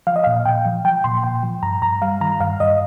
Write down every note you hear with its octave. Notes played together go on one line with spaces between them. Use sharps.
F3 F5
D#5
A#2 F5
A#2 G5
F3
F3 G5
A#2 C6
A#2 G5
F3
G2 A#5
G2 A#5
G3 F5
D#3 A#5
G2 F5
G2 D#5